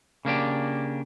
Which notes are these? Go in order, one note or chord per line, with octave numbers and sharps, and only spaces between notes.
C#3 A#3 D4 G4